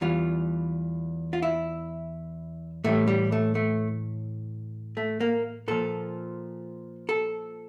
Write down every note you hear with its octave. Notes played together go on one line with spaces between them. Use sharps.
E2 E3 G3 F4
F4
E4
A2 E3 G3 A3
G3
A3
A3
A3
A#3
A#2 F3 A4
A4